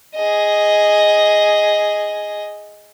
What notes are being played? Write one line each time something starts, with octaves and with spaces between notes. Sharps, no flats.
G#4 D#5